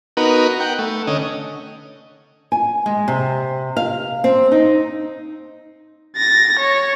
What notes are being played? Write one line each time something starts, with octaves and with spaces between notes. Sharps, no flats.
B3 D#4 F#4 A#4 B4
F#5 G5
A3
D3 C#4 D#5
G#5
G#3
C3
F5
C4
D#4
A6 A#6
C#5